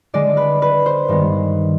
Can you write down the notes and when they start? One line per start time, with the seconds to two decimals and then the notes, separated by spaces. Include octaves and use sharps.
0.13 D3 G#3 D4 D5
0.37 B4
0.62 B4
0.86 C5
1.08 G2 D#3 G#3 B3